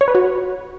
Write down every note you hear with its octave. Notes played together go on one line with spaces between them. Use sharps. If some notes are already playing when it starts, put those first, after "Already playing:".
C#5
B4
F#4